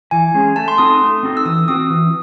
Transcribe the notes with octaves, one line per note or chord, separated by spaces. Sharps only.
E3 G#5
G#3 C#4 G#4
A3 A5
C6
C4 D#4 F#4 A4 D#6
D#6
A3
C4 D#4 F#4 A4
E6
E3 D#6
C4 F#4 D#6
E3